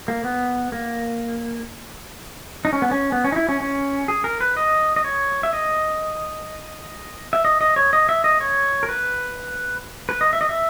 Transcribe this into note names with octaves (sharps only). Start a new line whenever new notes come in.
A#3
B3
A#3
D#4
C#4
B3
C#4
B3
C#4
D#4
E4
C#4
C#4
G#4
A#4
B4
D#5
D#5
C#5
E5
D#5
E5
D#5
D#5
C#5
D#5
E5
D#5
C#5
A#4
B4
B4
D#5
E5
D#5
E5